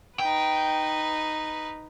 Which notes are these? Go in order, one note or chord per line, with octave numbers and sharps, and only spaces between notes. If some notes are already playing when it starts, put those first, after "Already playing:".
D#4 B4 G5